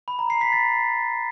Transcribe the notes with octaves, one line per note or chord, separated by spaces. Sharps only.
B5
A#5
C7
B6
A6